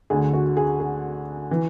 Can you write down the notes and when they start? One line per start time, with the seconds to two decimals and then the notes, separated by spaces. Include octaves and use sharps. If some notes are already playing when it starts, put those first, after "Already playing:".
0.10 D2 D3 G#4
0.33 F#4
0.57 G#4
0.80 G#4
1.51 E3